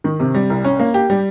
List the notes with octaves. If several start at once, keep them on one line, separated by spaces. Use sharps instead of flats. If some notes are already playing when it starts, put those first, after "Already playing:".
D#3
C3
G3
C2
C#4
A#3
G4
G3